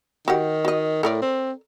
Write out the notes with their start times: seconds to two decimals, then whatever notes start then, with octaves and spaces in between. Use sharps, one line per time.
0.28 D#3 F#4 G4 F#5
0.65 F#4 D#5
1.03 A2 A4 A#4 D5
1.22 C4